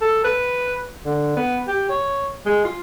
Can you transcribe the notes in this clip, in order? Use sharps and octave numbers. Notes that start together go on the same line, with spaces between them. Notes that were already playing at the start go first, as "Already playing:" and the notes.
A4
B4
D3
B3
G4
C#5
G#3
F4